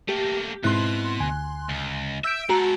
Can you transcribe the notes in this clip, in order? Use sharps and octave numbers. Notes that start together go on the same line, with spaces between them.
A3 A#3 G4
G#2 B2 C4 E4 C6 F#6
D2 G#5
C#2
E5 E6 G6 D7
G#3 F#4 A4 A#5